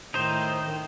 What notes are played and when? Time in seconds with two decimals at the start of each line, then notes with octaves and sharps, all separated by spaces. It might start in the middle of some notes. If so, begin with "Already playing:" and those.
0.14 A2 D#3 D#4 C5